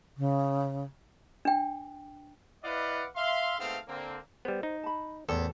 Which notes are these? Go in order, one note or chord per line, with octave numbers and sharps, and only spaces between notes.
C#3
D4 G5
E4 B4 D5 D#5 F5 F#5
E5 F5 C6
G#2 A3 B3 C4 F5
D3 A#3 C4
G3 B3 C5
D#4
A5 B5
A1 E2 A4 A#4 C5 G5